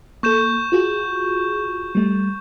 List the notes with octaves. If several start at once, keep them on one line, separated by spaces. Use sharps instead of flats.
A#3 A4 C#6 G6 E7
F4 F#4 G#4
G3 A3